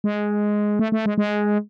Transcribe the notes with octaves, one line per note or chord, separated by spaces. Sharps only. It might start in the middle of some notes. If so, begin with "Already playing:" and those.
G#3
A3
A3
G#3
G#3